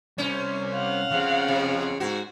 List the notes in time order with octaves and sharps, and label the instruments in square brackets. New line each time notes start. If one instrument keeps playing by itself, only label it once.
[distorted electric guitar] C2 C5 [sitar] C#4
[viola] F5 F#5
[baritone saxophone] C#3 [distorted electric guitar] F3 C4
[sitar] C3
[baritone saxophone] G#2 [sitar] F#4